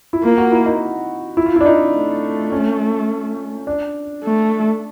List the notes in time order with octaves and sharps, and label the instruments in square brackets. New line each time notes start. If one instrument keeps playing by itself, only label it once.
[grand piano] E4
[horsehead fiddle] A#3 [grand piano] F4
[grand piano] F#4
E4
D#4
E4
F4
E4
D4
D#4
[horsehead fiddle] A3
[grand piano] C#4
D4
[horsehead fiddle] A3